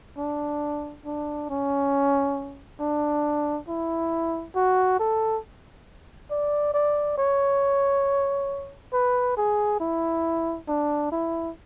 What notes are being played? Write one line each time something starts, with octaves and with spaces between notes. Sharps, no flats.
D4
D4
C#4
D4
E4
F#4
A4
D5
D5
C#5
B4
G#4
E4
D4
E4